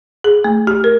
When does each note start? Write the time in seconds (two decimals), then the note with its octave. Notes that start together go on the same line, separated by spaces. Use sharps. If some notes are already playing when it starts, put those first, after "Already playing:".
0.24 G#4
0.44 A3
0.67 G4
0.84 A#4